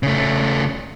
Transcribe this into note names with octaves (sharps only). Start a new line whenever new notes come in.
C#3 A3